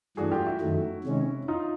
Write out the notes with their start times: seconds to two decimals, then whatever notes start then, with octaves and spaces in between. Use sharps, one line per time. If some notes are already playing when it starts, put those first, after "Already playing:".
0.17 G2 E3 A3 D4 F#4 G#4
0.31 F4 G4
0.46 E4 F#4
0.61 F#2 D#3 F#3 A3
1.04 C3 D#3 G#3 C#4
1.48 D#4 F4